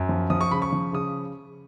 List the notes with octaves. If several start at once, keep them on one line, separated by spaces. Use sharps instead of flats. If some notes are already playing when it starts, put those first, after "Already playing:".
Already playing: F#2
F3
F3 D#6
C#6
C#3 B5
C#6
F3
C#3 D#6